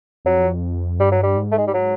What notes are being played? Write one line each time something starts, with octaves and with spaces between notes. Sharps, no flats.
F2 F#3
G2 G3
F#3
G3
G#2
A3
G#3
G3
F#3